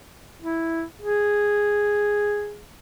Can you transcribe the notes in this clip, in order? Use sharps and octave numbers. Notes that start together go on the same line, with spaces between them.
E4
G#4